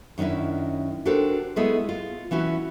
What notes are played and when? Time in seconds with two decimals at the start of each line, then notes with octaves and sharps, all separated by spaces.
0.18 F#2 D#3 C#4 D4 E4
1.05 D4 F#4 G4 A4 A#4 C5
1.56 G#3 A3 B3 E4 G#4 A4
1.89 F4
2.31 E3 C#4 E4 F#4